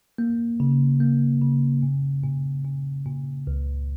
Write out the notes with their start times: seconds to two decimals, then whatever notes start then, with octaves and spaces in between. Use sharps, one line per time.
0.18 A#3
0.60 C#3
1.00 A#3
1.42 C#3
1.83 A#2
2.24 A#2
2.65 A#2
3.06 A#2
3.47 C#2